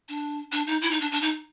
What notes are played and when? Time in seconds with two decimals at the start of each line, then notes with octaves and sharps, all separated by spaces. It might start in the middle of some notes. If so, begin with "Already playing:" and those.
0.09 D4
0.52 D4
0.67 D#4
0.82 E4
0.91 D#4
1.01 D4
1.11 D4
1.22 D#4